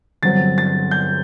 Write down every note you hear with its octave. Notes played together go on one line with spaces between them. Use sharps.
G1 G2 F#3 C4 A6
A6
G6